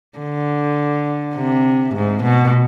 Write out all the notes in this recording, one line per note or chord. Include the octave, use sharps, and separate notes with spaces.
D3
C3
G#2
B2